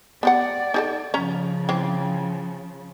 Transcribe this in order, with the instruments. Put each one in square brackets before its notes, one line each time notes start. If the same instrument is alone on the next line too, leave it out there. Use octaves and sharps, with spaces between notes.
[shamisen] B3 G4 F#5 [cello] D5
[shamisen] D#4 G#4 A4
[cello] C#3 F3 [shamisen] C#4 A#5
[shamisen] E3 C4